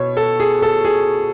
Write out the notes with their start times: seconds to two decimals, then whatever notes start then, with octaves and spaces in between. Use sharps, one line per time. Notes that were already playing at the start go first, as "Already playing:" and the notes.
Already playing: B2 C#5
0.17 A4
0.40 G#4
0.62 A4
0.85 G#4